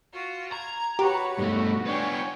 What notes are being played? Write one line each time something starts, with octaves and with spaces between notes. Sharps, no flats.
F4 F#4
A#5 G#6
F#4 G4 B4 C#5
G2 A3 B3 F#4
B3 D4 C#5 G5 G#5